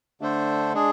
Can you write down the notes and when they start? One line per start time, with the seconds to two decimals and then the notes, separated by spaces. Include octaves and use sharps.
0.21 D3 A3 D4 A4 C5
0.73 G#3 D4 G#4